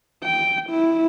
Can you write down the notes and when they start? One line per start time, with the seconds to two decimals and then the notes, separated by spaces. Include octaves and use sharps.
0.24 G5
0.70 E4